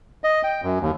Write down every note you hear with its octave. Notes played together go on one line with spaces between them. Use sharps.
D#5
G5
F#2
D#2